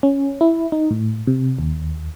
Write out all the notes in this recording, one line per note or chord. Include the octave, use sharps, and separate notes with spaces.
C#4
E4
D#4
A2
C3
D#2